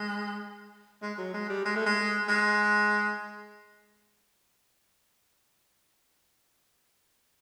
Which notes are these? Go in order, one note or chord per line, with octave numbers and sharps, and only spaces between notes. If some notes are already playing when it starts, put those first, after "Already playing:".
Already playing: G#3
G#3
F#3
G#3
G3
G#3
A3
G#3
G#3